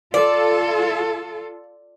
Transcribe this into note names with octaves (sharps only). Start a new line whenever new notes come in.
F4 A4 D5